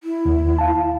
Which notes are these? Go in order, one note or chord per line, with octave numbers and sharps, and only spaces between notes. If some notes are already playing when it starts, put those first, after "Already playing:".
E4
D#2
F5 A5